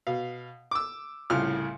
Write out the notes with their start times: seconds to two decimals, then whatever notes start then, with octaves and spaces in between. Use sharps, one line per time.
0.07 B2 F5
0.71 D6 E6
1.30 C2 A2 C#3 F4 F6